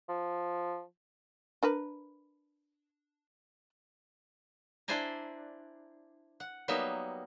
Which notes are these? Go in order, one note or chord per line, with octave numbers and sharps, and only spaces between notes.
F3
D4 A#4 B4
D4 E4 C5 D5 G#5 A#5
F#5
F#3 G3 A#3 B3 D#4 E5